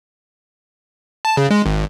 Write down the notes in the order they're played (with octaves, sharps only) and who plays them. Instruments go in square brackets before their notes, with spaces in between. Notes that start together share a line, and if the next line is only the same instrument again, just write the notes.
[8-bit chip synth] A5
C#3
G#3
G#1